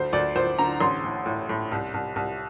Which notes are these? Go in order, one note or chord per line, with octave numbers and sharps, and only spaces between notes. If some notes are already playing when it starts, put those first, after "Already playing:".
Already playing: D2 C5
D2 D5
D2 C5
D3 A#5
A1 C6
A2
A2
A2
C2
C2
C2